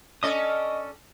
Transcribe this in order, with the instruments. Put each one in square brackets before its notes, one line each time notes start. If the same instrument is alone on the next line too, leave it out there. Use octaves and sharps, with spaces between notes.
[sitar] C#4 A4 D5 [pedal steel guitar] D#5 D#6